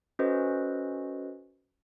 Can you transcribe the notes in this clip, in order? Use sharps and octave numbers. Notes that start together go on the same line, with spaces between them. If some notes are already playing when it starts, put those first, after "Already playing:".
C#4 F#4 A4 B4 C5 D#5